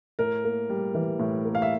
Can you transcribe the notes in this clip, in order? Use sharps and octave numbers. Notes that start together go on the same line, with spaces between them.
A2 A#4
A#3
G3
E3
A2
A#3
F5
E5